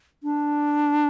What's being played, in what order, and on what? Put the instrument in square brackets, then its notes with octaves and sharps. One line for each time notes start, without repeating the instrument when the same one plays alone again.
[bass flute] D4